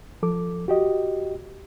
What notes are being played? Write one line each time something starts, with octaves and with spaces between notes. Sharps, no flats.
F3 A4 D6
F#4 G4 D#5